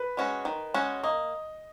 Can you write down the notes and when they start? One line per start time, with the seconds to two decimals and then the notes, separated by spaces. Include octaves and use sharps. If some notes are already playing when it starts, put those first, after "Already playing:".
Already playing: B4
0.17 G#3 C#4 F#4
0.45 D#3
0.74 G#3 C#4 F#4
1.03 A#3 D#5